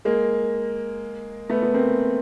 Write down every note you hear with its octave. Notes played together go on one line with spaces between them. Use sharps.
G#3 A#3
A3 B3
B3
A#3 C4